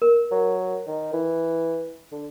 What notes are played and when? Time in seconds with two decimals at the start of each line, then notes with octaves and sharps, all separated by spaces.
0.02 A#4
0.31 F#3
0.87 D#3
1.13 E3
2.12 D3